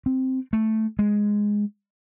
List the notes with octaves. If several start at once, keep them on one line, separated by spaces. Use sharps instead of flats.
C4
A3
G#3